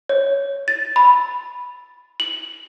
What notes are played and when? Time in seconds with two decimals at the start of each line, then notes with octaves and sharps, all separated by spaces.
0.09 C#5
0.68 A6
0.96 B5
2.20 F#7